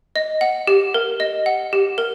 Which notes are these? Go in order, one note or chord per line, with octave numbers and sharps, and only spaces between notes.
D#5
F#5
G4
A#4
D#5
F#5
G4
A#4